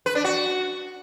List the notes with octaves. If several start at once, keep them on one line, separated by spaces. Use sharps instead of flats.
B4
D4
F#4